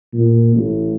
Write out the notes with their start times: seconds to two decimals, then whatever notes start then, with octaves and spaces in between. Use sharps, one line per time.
0.14 A#2
0.55 A1